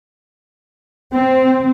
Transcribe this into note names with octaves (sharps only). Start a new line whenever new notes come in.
C4